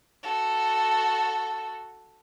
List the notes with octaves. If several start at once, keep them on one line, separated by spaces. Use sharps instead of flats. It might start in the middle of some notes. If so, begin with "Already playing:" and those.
F#4 A4